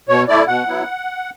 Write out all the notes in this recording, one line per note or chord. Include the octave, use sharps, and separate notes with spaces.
B2 C#5
A3 E4 D5
B2 F#5
F#3 B3 E4